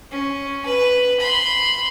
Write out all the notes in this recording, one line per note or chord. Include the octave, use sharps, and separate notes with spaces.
C#4
B4
B5 C6